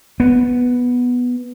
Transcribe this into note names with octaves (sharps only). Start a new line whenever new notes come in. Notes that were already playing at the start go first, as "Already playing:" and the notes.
B3